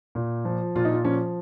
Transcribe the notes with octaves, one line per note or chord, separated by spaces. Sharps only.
A#2
F3
A#2 F4
D#4
F4
F3 C#4